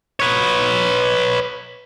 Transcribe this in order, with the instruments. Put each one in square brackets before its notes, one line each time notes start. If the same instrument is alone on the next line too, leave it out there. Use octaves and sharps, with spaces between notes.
[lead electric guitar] B4 C#5